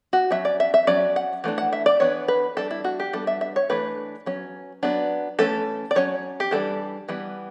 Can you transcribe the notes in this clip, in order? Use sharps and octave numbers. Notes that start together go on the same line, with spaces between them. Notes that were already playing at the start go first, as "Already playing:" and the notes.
F#4
F#3 C#4 E5
D5
E5
E5
F#3 C#4 D5
F#5
E3 A3 D4
F#5
E5
D5
E3 B3 D4 C#5
B4
G3 D4 A4
E4
F#4
G4
G3 B3 D4 A4
E5
E5
C#5
E3 A3 D4 B4
F#3 C#4
F#3 B3 D4
E3 A3 C#4 A4
D5
F#3 C#4 C#5
G4
E3 G3 D4 A4
E3 G3 B3